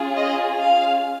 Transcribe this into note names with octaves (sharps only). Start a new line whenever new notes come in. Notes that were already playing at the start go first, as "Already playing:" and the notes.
Already playing: C#4 F4 G#4
D#5
F5